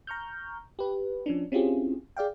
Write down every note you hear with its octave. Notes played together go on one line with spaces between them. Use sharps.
A#5 C#6 F6 G6
G4 B4
F3 C#4 D4
C4 C#4 E4 F4 G4 G#4
G#4 D5 F5 G5